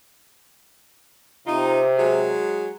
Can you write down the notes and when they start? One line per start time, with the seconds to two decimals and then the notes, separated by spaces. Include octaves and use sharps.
1.47 C3 D#4 F4
1.98 F#3 G#3 G#4